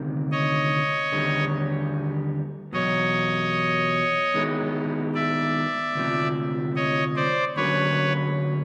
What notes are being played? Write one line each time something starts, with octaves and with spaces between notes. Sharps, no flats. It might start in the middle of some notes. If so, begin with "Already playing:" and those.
Already playing: D2 C3 D#3
C#5 D#5
D#2 D3 G3
E2 B2 F#3 C#5 D#5
D#3 G#3 B3 E4
D5 E5
D2 C3 F3
C#5 D#5
C5 D5
D2 D3 F#3 A#3 C#4 B4 C#5